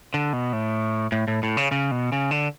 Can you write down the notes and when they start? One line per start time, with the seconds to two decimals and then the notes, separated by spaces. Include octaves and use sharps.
0.14 D3
0.33 B2
0.53 A2
1.12 A2
1.28 A2
1.43 A2
1.57 C#3
1.71 C#3
1.91 B2
2.12 C#3
2.31 D3